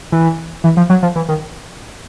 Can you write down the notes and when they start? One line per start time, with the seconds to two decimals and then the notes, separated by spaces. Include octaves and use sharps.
0.12 E3
0.64 E3
0.77 F3
0.90 F#3
1.03 F3
1.16 E3
1.29 D#3